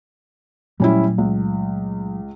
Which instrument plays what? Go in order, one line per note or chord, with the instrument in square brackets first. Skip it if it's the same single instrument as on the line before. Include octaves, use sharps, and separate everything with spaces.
[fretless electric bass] A#2 F#3 A3 [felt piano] G3 C#4 E4
[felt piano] C#2